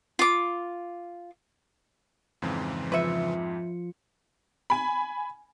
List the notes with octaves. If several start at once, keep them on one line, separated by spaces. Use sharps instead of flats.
F4 D6
F2 G#2 C#3 E3 C4
F3 F4 B4 E5 C#7
G#5 B5